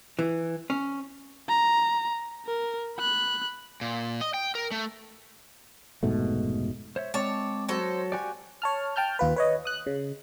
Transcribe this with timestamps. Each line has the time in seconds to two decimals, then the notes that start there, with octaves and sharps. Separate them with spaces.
0.19 E3
0.70 C#4
1.49 A#5
2.46 A#4
2.98 B5 F#6
3.81 A#2
4.21 D#5
4.34 G5
4.55 A#4
4.71 A3
6.03 F1 G#2 B2 A3
6.96 C5 C#5 E5
7.14 G#3 C4 C#5 A5 D6
7.69 F#3 A4 C5
8.12 F#4 G4 D5 G#5
8.62 C#5 A5 F6
8.96 G5 A5 F6 G6
9.19 D#2 F4 B4
9.36 B4 C#5 D#5
9.65 D#6 F#6
9.86 C#3